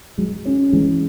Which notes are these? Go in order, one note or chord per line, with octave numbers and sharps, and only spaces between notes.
F#3 G#3
C#4
E3 G#3